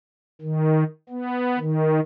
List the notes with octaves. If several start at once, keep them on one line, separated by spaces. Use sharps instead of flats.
D#3
B3
D#3